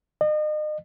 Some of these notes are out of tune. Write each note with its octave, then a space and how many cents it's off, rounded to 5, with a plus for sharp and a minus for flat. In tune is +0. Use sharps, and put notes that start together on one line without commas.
D#5 -35